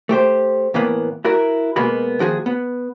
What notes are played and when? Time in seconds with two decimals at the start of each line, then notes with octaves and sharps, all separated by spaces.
0.09 A3 G4 C5
0.74 A2 E3 A#3 B3
1.25 E4 F#4 A#4
1.76 B2 G#3 A#3 B3 F#4 B5
2.19 D#2 F3 F#4 G#4
2.46 B3